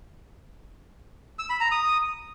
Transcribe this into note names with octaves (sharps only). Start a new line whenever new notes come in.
E6
B5
A#5
D#6